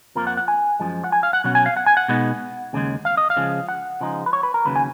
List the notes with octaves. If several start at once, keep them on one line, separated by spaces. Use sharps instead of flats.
F2 F3 A#3 A#4
F#5
F#5
G#5
F#2 F3 G#3
F#5
G#5
F5
F#5
B2 F#3 C#4 F#5
G#5
F5
F#5
G#5
F#5
B2 G#3 B3 D#4
D#2 C#3 G#3
F5
D#5
F5
C#3 F3 G#3
F#5
C#3 F3 G#3 D#4
B4
C#5
B4
A#4
D#2 C#3 F#3 B4
G#5